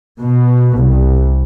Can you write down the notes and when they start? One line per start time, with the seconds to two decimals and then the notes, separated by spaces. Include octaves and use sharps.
0.19 B2
0.78 C2